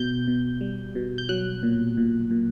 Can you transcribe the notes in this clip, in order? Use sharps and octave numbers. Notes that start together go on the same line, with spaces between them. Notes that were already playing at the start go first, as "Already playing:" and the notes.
Already playing: B2 G6
B2
G3
B2
G6
F#3 F#6
A#2
A#2
A#2